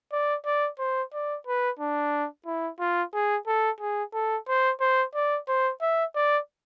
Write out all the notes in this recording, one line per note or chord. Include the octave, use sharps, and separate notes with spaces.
D5
D5
C5
D5
B4
D4
E4
F4
G#4
A4
G#4
A4
C5
C5
D5
C5
E5
D5